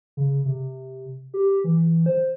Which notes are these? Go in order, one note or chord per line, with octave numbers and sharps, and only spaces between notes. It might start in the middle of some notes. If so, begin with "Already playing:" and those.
C#3
C3
G4
E3
C5